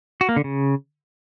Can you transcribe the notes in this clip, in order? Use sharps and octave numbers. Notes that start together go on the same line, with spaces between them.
F#4
A#3
D3
C#3